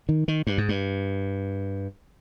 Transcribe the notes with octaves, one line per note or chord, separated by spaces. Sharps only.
D#3
D#3
G2
G#2
G2